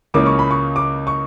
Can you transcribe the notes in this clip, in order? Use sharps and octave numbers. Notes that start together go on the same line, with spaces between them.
C#2 C#3 E3 A#3 C#4 D6
C#6
B5
C#6
D6
C#6